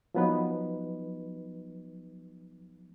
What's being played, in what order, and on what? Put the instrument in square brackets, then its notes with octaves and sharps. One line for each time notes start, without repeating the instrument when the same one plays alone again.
[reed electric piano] F3 F#3 B3 D#4 B4